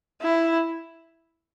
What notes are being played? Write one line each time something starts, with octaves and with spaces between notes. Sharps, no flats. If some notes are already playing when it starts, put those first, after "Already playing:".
E4